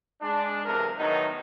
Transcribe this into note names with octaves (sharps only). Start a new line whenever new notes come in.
G#3 D4
B1 E2 C3 A4 A#4
A2 D#3 F#3 B3 D#4